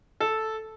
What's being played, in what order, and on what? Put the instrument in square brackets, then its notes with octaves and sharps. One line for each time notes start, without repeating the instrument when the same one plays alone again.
[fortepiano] A4